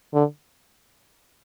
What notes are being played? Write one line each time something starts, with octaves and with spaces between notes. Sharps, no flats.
D3